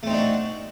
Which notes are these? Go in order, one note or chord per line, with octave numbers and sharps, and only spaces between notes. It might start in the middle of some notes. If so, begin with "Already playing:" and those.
A3 C4 D4 D#4 F#4